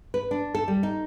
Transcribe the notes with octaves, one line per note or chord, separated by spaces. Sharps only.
B4
D4
A4
G3
D#4